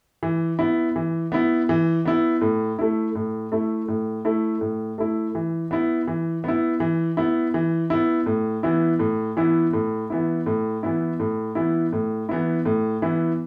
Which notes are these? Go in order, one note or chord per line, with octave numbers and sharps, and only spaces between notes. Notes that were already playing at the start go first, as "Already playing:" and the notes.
E3
B3 E4
E3
B3 E4
E3
B3 E4
A2
A3 E4
A2
A3 E4
A2
A3 E4
A2
A3 E4
E3
B3 E4
E3
B3 E4
E3
B3 E4
E3
B3 E4
A2
E3 B3 E4
A2
E3 B3 E4
A2
E3 B3 E4
A2
E3 B3 E4
A2
E3 B3 E4
A2
E3 B3 E4
A2
E3 B3 E4